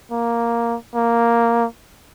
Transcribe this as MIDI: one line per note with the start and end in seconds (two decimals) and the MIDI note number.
0.12 0.77 58
0.95 1.66 58